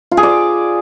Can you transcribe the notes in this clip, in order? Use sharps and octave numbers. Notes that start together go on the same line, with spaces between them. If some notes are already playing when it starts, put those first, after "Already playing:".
F4
G#4
D5